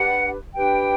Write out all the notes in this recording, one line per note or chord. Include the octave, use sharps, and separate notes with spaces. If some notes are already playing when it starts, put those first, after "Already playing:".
Already playing: D4 G4 B4 F#5
D4 G4 B4 G5